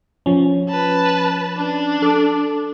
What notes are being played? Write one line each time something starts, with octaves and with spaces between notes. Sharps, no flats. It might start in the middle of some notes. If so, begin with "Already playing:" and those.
F3 C#4
B4 A5
D4
A4 D6